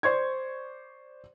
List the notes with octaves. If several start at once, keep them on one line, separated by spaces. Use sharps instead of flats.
C5 D5 C#6 G#6